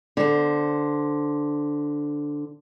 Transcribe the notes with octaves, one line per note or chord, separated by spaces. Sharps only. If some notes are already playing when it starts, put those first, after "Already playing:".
D3 C5